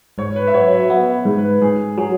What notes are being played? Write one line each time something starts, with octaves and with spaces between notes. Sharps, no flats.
G#2 C#5
B4
E5
F#3 C#5
E5
B3 E5
G#2
B4
G#2 G#4
F#3 G#4